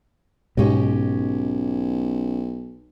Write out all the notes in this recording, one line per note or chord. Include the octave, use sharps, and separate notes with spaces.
B1 G#2 B2 C#4 G4 D#5